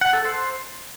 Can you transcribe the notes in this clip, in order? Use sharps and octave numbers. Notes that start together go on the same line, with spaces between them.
F#5
A4
C5